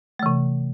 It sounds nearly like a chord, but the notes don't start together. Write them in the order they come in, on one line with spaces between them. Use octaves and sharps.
A3 E3 C3